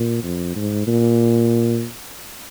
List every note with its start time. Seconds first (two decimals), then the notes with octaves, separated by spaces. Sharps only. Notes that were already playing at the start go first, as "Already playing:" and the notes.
Already playing: A#2
0.23 F2
0.56 G#2
0.87 A#2